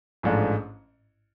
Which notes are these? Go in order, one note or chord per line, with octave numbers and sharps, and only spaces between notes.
A1 G#2 F3 A3 D4